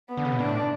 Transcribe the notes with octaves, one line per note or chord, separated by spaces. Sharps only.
B3
D3
C#3
B2
A2 D4